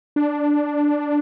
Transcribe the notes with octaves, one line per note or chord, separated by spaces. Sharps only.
D4